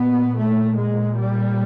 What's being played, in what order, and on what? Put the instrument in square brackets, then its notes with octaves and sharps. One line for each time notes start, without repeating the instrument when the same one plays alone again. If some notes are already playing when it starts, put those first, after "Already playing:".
Already playing: [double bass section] A#2 B3
A3
G#3
G3